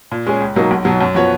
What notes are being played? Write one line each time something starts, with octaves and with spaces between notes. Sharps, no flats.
A#2
G#3 C#4 G#4
C#2
B2 F#3 A#3 D#4
B1
B2 F#3
F#2
F3 B3 F#4 C#5